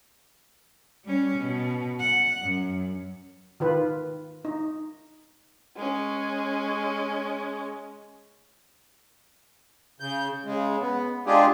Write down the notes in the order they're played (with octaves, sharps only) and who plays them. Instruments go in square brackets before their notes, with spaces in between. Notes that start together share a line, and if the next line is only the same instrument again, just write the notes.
[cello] G3 C#4
B2
F#5
F#2
[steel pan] D#3 F4 B4
D#4
[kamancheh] G#3 C#4
[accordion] C#3 G6
C#3 G#3
B3
G#3 D4 F4 G4 G#4